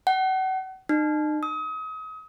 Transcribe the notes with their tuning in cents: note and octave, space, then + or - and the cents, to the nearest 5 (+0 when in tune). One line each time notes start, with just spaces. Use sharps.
F#5 +35
D#4 -35
D#6 +35